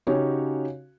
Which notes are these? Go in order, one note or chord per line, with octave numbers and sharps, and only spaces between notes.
C#3 C#4 D#4 F#4 G4 C#5